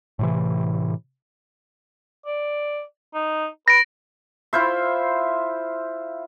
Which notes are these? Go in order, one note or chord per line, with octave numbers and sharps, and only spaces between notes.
A2 C3 E3
D5
D#4
B4 A#6 D7
E4 F4 C5 E5